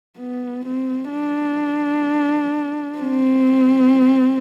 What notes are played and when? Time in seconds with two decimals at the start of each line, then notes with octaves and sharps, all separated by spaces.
0.18 B3
0.66 C4
1.12 D4
2.99 C4